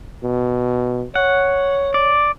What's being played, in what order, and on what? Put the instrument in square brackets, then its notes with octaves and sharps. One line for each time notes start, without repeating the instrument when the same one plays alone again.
[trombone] B2
[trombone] C#5 [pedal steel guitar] F#5
[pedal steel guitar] D5